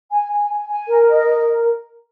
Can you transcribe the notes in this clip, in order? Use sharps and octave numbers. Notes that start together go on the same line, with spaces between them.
G#5
G#5
G#5
G#5
A#4
D#5
A#4